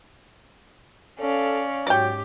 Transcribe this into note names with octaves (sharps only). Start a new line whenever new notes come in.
C#4 A4 D5 F5
G#2 F#3 G4 D5 G5